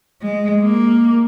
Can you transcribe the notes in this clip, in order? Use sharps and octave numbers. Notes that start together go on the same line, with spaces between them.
G#3
A#3